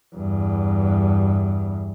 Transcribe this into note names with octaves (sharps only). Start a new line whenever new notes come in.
E2 G2